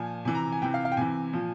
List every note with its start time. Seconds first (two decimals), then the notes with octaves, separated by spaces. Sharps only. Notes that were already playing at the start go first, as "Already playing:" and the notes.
Already playing: A#2 F3 G#5
0.25 C3 E3 G#5
0.35 A#5
0.52 G#5
0.62 C3 E3 G5
0.74 F5
0.85 F5
0.92 G5
0.97 C3 E3 G#5
1.33 A#2 F3